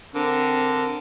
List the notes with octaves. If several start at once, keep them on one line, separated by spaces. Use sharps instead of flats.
D3 C4 A#4